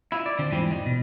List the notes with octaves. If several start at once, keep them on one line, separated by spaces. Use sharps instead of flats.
E4 F4
D5
D3 C4 D4
E2 G#2 E3 F3 G3 C4
D#4
B2